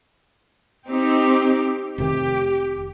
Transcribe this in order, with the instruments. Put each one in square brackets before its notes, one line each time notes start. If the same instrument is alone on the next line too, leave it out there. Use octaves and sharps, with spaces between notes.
[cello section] C4 D#4 G4
[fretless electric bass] F1 C3 D#3 [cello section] G4